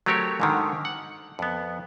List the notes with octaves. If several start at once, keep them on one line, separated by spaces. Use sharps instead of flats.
F#3 A3 C4 G4 A#4 C#5
G#2 D3 D#3
F#5
F2 B3